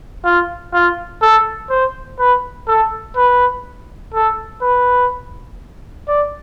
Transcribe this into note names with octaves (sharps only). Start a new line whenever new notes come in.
F4
F4
A4
C5
B4
A4
B4
A4
B4
D5